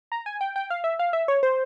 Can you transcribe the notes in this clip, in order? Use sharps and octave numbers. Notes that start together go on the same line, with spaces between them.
A#5
G#5
G5
G5
F5
E5
F5
E5
C#5
C5